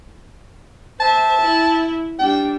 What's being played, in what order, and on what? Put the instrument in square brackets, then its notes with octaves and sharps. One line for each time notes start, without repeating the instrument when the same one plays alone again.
[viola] C5 E5 [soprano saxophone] A5
[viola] E4
[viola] G3 D4 [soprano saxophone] G5